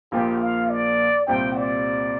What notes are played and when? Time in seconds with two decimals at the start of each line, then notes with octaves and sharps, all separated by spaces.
0.12 A#1 A#2 A#3 F4 G4
0.41 F5
0.70 D5
1.27 C2 A#2 G3 C4 G5
1.56 D5